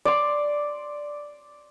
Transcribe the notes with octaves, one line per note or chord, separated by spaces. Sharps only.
D5 C6